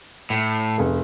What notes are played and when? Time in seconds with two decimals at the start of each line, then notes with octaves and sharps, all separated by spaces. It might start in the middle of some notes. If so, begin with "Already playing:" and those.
0.30 A2
0.78 F1 G#4